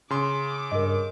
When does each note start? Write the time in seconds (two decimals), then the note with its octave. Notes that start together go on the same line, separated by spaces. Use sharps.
0.10 C#3 C6 D6
0.71 G2 A#4 D#5